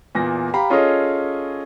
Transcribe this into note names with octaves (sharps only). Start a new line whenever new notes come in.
E2 A#2 A#6
G4 F5 A#5 B5
C#4 F4 G#4 A4 C#5 D#5